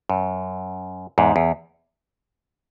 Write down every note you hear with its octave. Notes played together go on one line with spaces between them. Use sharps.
F#2
E2 G#2
E2